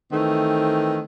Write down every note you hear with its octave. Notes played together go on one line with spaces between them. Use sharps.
D#3 E3 A3 C4